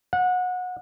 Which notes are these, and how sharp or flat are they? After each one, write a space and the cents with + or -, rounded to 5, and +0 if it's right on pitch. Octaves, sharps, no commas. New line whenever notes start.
F#5 -25